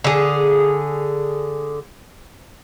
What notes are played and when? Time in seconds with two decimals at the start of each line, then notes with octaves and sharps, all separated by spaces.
0.04 D3 G#4